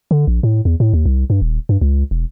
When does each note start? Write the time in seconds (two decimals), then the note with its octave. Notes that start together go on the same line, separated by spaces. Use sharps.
0.11 D3
0.27 A#1
0.43 A2
0.65 E2
0.80 A2
0.93 D#2
1.06 C2
1.30 G2
1.42 D#1
1.69 G2
1.81 C#2
2.11 E1